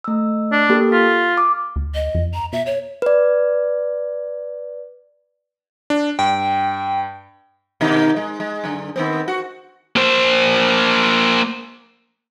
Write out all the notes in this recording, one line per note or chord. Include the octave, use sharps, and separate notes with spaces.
A3 E6
D4
A#3 G4 A4
F4 B6
D6 F6
D2
D#5
F2
A#5
B2 E5
C#5
B4 D5
D4
G2 G5
B2 D#3 D#4
G#3
G#3
F#2 D3
D#3 B3 C4
F#4
A#3 C5